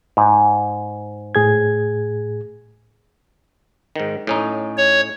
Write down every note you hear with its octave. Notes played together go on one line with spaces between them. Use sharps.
G#2
A2 G#4 G#6
G#2 D#3
A2 C#4 D#4
C#5